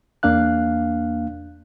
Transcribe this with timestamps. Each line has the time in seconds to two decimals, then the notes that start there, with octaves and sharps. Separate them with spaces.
0.23 E2 A#3 D4 F5 F#6